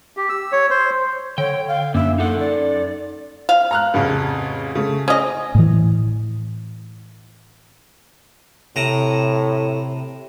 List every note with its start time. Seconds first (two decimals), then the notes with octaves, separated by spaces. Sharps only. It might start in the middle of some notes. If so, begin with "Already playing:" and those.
0.17 G4
0.29 E6
0.52 C#5
0.70 C5
1.38 D3 C#5 G5
1.68 F5
1.94 F#2 A#3 D4 E5
2.18 D#4 A4 F#5
2.39 D5
3.49 F5
3.71 A#5 F6 F#6
3.94 A1 F2 C#3
4.75 C#3 A3
5.08 C#4 D#5 D#6
5.55 A2 E3
8.76 A2 C3 A#5